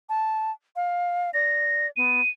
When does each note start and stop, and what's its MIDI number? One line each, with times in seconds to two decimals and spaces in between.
0.09 0.51 81
0.76 1.30 77
1.34 1.91 74
1.34 1.87 94
1.97 2.21 59
1.97 2.29 99